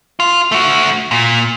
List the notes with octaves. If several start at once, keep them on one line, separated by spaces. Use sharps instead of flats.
F4
A3 F#4
A#2